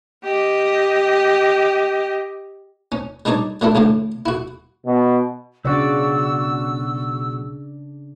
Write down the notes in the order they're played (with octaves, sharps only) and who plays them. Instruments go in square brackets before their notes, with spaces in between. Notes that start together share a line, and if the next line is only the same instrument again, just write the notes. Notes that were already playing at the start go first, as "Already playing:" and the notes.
[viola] G4 D#5
[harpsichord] C#4
G3 D4 D#4 C#5 D5
F#3 A3 D4 E4
A1 A2 D3 D4
E4 F#4
[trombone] B2
[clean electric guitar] B1 F#4 [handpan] C#3 D4 D5 [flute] E6